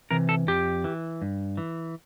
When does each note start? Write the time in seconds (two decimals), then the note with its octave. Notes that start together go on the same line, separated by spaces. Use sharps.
0.11 C3 E3 A#4
0.29 A4
0.47 F2 G4
0.84 E3
1.22 G2
1.57 E3